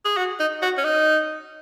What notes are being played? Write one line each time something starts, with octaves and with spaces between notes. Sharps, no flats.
G#4
F#4
D#4
F#4
C#4
D#4